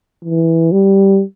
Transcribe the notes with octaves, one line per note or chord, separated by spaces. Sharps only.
E3
G3